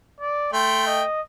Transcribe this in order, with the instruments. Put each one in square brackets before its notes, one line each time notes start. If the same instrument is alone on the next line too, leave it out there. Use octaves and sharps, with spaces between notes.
[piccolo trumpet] D5
[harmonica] A3 G5 [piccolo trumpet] C6
[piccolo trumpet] D#5